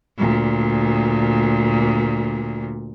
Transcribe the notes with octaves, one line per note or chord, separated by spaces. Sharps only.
D2 A#2